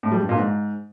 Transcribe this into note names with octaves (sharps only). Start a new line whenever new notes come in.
A2
G3
G2
A#2
G#2